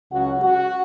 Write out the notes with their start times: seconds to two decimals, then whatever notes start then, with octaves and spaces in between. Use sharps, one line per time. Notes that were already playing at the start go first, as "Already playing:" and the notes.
0.11 C#2 C#3 F#3 C#4 F#4 F#5
0.39 F#4 F#5